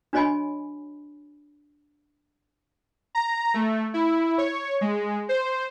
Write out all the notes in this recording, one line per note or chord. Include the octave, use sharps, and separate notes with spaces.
D4 F#4 C#5 D#5 G#5 B5
A#5
A3
E4
C#5
G#3
C5